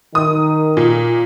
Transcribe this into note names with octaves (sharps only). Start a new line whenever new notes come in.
D#3 D#6
A#2